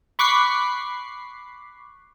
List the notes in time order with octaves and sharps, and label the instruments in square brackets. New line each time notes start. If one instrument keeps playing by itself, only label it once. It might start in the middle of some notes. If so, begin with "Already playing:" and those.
[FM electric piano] B5 C#6 D6 F#6 B6 C7